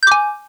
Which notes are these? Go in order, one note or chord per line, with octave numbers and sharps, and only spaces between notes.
G#5 D6 G6